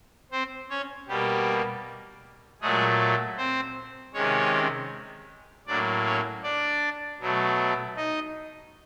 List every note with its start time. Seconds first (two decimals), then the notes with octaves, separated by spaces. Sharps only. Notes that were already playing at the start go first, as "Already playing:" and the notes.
0.32 C4 C5
0.70 C#4 C#5
1.08 B2 G3 A#3 G4
2.61 A#2 F#3 G#3 A3 G#4
3.37 C4 C5
4.14 C3 D#3 G#3 C#4 C#5
5.67 A2 F#3 A#3 D4 D5
6.05 C#4 C#5
6.43 D4 D5
7.20 B2 F#3 A3
7.96 D#4 D#5